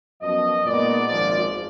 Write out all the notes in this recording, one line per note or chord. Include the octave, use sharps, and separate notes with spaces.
F#2 F3 B3 D4 D#5
A#2 G#3 B3 D#4 D5
G#1 F#2 F3 D5